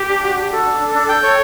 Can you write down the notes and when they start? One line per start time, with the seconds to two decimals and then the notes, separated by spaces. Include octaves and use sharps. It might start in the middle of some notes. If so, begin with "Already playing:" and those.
Already playing: G4
0.09 D4
0.23 F#4
0.37 D4 G4
0.51 F#4 A4
0.66 D4
0.80 D4
0.95 D4
1.09 G5
1.23 C#5